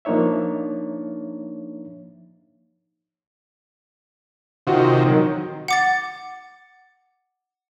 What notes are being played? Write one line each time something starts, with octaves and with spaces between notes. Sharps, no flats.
F3 A#3 D4 D#4 C#5 E5
C3 D#3 F4 F#4
D#3 F#3
F#5 D6 A6